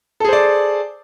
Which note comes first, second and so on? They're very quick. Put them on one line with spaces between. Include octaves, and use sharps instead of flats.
A4 G#4 C5 D5